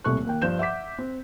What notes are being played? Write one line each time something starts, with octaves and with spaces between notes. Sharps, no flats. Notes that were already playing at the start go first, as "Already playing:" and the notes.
D#1 C2 A3 C#6 F#6
D#2 A#3 G5
G2 F3 C5 G6 E7
E5 F#5 D6 B6
C4